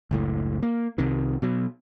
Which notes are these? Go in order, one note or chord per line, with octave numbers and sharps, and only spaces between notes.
F#1 C#2 A2
A#3
C2 C3 D#3
B2 F#3